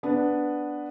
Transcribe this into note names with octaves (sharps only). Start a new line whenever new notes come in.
B3 D4 B4